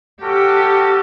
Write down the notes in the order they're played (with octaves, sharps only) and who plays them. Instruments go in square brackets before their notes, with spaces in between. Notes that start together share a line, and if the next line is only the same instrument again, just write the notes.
[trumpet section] C#4 F#4 A4 [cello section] G4